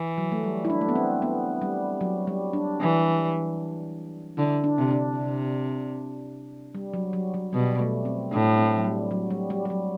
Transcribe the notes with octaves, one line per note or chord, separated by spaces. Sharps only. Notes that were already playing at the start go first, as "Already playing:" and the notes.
Already playing: E3
F#3
A3
G3
E4
D4
A3
B3
C4
B3
G3
F#3
G3
D4
E3
D3 E4
D4
C3
D4
C3
G3
F#3
F#3
F#3
B2 G3
A3
C4
A2 D4
C4
F#3
G3
F#3
G3
G3
G3
F#3